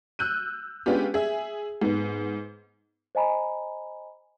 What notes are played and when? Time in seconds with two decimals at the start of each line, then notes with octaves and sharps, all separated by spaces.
0.19 E6 F#6 G6 D#7
0.86 G#3 B3 C#4 D4 F4 G4
1.14 G#4 E5
1.82 G#2 B3
3.15 C5 D#5 G#5 A#5 B5